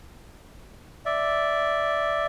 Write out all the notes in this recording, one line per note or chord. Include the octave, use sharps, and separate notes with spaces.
D5 E5